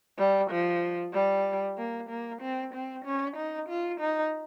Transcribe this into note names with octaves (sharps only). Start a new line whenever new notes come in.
G3
F3
G3
A#3
A#3
C4
C4
C#4
D#4
F4
D#4